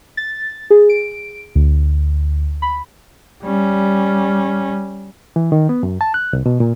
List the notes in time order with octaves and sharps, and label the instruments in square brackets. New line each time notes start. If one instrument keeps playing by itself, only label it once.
[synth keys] A6
G#4
D7
D2
B5
[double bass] G3 C#4
[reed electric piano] E3
D#3
B3
F#2
A5
F#6
C2
B2
A#2